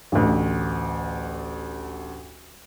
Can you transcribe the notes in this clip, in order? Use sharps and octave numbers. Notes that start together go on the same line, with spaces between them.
A1 D2